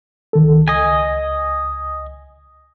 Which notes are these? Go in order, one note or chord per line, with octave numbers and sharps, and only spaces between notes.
C#2 D#3 A4
C#2 D#5 G#5